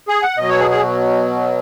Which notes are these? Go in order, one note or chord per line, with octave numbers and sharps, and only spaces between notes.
G#4
F#5
B2 F#3 D#5
C#5
G#4
G#4